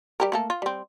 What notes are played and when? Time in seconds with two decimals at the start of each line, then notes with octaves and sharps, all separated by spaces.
0.20 G3 G4 A#4
0.32 A3 A#3 A4
0.50 F4
0.62 G3 C4